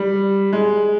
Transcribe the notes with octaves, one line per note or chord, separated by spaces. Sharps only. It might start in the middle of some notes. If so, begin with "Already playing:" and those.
Already playing: G3
G#3